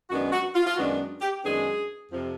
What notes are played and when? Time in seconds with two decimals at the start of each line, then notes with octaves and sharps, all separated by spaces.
0.09 F#2 D#3 G#3 B3 D4 F#4
0.32 F#4
0.55 F4
0.66 F4
0.77 F#2 D#3 G#3 B3 D4 F#4
1.21 G4
1.44 F#2 D#3 G#3 B3 D4 G#4
2.11 F2 C3 F3